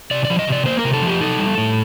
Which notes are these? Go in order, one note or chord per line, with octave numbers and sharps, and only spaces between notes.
C3 D5
D5
F3
D#5
C3 D5
A#3 C5
A#4
C3
A4
F3 G4
D#4 A4
G3
A2